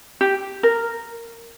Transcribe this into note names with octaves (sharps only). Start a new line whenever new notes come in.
G4
A#4